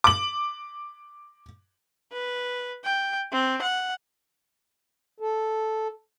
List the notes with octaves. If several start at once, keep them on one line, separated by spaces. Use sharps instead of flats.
D6 F#7
B4
G5
C4
F#5
A4